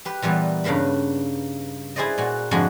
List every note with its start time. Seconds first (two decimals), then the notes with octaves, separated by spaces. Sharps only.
0.05 G4 B4
0.22 A#2 E3 G3 B3
0.64 G2 C#3 A#3 B4 B5
1.96 E4 G#4 B4 C5 D5 D#5
2.18 A#2 F#4
2.51 F2 G#2 D3 G#3 A3 F#4